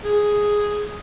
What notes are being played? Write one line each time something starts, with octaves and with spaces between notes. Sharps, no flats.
G#4